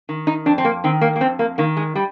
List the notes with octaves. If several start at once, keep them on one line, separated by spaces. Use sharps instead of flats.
D#3
D#4
F2 D4
C4
A#3
D#3 C4
A#3
A#3
F2 C4
A#3
D#3 A#3
G#3
G3